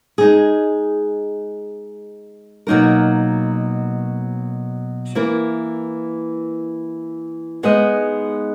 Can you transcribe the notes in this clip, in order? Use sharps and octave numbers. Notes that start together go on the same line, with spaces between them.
G#3 D#4 G#4
B2 F#3 A#3 D#4 A#4
E3 A#3 E4 A#4
G#3 B3 D#4 G#4 D#5